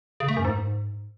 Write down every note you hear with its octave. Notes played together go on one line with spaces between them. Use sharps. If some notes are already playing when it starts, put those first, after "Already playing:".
C#3
A3
F#2
G#2